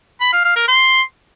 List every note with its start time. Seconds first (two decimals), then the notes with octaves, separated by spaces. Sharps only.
0.21 B5
0.33 F5
0.44 F5
0.56 A#4
0.68 C6